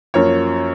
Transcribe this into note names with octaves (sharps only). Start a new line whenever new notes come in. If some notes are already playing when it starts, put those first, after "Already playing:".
F#2 F3 A#3 C#5